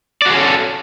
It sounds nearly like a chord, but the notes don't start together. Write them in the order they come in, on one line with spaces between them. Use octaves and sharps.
D5 F#4 G#4 C#4 A4